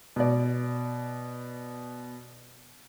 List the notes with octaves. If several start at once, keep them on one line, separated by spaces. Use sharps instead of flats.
B2 D5